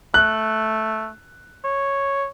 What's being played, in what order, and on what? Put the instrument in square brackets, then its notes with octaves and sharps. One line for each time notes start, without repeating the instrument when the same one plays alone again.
[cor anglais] A3 [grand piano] F#6
[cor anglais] C#5